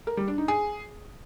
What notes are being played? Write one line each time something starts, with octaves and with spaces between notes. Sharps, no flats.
A#4
G3
D4
D#4
G#4